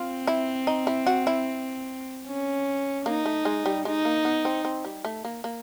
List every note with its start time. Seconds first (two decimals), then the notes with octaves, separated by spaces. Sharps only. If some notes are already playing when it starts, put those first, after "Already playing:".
Already playing: C4 F4
0.27 E4
0.67 D#4
0.87 E4
1.07 F#4
1.27 E4
2.26 C#4
3.06 A#3 D#4
3.26 A3
3.45 G#3
3.66 G3
3.85 G#3 D#4
4.05 A#3
4.25 B3
4.45 C4
4.65 C4
4.85 G3
5.05 A3
5.25 A#3
5.44 A#3